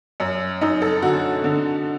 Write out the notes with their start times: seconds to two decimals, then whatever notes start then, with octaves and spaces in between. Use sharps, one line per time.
0.20 F#2
0.61 F#2 D#4
0.82 A4
1.02 D3 F#4
1.44 D3